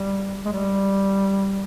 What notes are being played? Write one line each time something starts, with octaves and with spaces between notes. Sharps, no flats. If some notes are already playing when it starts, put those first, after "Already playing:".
Already playing: G3
G#3
G3